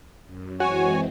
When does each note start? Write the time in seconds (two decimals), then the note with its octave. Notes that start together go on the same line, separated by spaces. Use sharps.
0.24 F#2
0.60 E3 G#3 C4 F#4 C#5 G#5